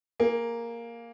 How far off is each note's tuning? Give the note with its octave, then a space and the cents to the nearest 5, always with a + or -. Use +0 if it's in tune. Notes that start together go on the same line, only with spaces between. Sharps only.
A#3 +0 G#4 +0